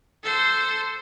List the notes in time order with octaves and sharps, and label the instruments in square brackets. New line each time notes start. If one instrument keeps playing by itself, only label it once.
[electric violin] A4 C5